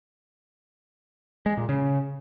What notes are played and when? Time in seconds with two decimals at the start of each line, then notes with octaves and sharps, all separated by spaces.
1.46 G#3
1.57 A#2
1.69 C#3